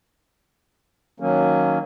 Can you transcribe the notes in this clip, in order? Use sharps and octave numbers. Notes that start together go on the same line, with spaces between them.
D#3 F#3 A#3 C#4